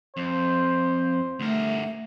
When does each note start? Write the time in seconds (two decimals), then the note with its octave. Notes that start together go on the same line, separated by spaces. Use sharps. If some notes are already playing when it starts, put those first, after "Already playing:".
0.17 F2 C5
1.40 D2 A3 A#4